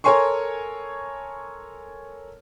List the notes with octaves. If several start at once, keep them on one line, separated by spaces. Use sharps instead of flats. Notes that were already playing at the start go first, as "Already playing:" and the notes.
A4 A#4 C#5 G#5 C6 C#6